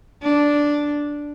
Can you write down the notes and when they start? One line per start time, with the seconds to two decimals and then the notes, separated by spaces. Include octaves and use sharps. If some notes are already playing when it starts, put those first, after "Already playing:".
0.23 D4